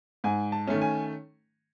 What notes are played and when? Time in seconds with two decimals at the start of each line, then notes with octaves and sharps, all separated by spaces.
0.24 G#2 G#5
0.52 A5
0.67 D#3 A3 C#4
0.81 G#5